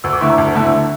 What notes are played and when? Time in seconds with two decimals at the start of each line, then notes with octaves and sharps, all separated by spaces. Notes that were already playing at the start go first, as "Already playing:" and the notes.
0.04 D2 E6
0.13 D6
0.21 D3 A3 E4 C#6
0.30 A#5
0.38 D2 A5
0.56 D3 A3 E4